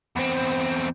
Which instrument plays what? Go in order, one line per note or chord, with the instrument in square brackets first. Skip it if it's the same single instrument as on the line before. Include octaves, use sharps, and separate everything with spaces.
[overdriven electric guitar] E2 C4